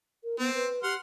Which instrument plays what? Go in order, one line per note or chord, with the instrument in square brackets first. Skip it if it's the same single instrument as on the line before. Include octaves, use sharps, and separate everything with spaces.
[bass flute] A#4
[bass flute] B3 [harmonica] C4
[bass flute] B4
[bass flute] G4 [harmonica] F#5 C6 F6